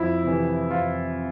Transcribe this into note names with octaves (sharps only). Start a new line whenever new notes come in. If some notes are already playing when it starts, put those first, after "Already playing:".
Already playing: F2 E4
C3 E3
F2 F4